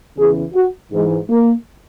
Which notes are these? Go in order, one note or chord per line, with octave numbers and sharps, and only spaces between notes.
E2 C#3 E3 G#4
F#4
G#2 E3 G#3
A#3